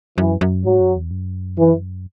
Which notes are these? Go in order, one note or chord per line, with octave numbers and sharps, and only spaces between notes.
F#2 E3
F#2
G#2 F#3
F#2
E2
F#2
E3